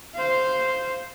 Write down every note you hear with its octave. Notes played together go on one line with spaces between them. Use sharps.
C5 F5